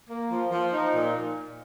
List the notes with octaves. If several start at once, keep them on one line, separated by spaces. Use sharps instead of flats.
A#3
F3
F3
D#4
A#2